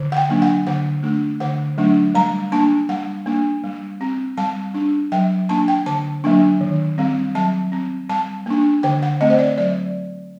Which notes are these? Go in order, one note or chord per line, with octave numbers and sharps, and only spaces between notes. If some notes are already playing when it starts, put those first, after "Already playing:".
Already playing: D3
F#5
G5
F#3 A#3 D4
F#5
D3 F#5
A3 D4
D3 F#5
F#3 A3 D4
G3 A#5
A#3 D4 A5
G3 F#5
A#3 D4
G3
C4
G3 A5
D4
F#3 G5
A#3 D4 A5
G5
D3 A5
F#3 A#3 D4
D#3
G3 C4
F#3 A5
C4
G3 A5
A#3 D4
D3 G5
F#5
A3 C4 D#5
C5
D5
F#3 D5